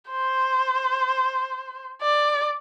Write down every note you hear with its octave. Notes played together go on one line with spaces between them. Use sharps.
C5
D5